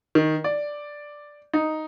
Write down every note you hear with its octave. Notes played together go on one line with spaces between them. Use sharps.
D#3
D5
D#4